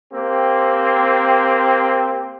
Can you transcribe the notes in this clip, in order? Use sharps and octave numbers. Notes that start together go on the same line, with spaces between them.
A#3 C4 G4